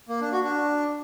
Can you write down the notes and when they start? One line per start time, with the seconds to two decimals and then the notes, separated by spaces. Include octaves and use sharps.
0.09 A#3
0.20 D4
0.32 F#4
0.44 D4